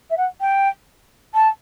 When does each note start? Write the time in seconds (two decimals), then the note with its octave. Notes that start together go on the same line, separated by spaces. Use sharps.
0.10 E5
0.17 F#5
0.40 G5
1.34 A5